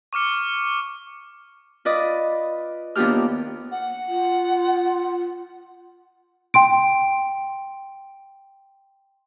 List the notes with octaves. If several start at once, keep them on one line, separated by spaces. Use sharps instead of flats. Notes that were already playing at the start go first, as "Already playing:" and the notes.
C#6 D6 F6 C#7
F4 B4 D5 D#5
D#2 B3 D4 F4 G4 F6
F#5
F4
G5 C6 D7